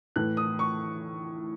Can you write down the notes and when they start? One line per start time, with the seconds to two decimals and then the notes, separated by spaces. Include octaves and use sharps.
0.16 A2 E3 F#6
0.37 D#6
0.59 C#6